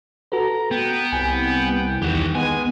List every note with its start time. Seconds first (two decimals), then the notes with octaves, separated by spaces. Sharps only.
0.32 F#4 A4 B4 A#5
0.71 B3 G5
1.12 C2 G#5
2.02 E2 D#3 G4 F#5
2.35 G#3 B3 G#5